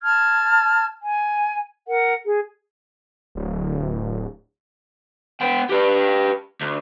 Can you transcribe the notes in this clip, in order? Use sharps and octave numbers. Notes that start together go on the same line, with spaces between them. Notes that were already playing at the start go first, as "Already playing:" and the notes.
A5 F6 G#6
G#5
A#4 F#5
G#4
D1
B3 G5
G4 B4
D2